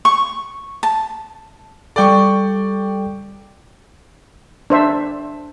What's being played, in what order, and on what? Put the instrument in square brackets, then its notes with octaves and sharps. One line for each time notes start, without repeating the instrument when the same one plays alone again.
[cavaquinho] C#6
A5
[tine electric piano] G3 A4 [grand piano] D5 G5 C#6
[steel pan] D4 C5 E5